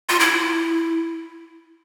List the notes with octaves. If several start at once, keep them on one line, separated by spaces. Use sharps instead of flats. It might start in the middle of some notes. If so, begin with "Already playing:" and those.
F4
E4